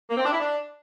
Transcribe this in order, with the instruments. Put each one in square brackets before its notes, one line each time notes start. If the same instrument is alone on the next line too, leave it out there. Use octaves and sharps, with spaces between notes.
[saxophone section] A#3
C4
D4
E4
D4